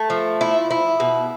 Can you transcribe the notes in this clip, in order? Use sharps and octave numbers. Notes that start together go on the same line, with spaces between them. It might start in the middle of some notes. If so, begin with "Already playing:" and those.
Already playing: A3
F3
E4
E4
B2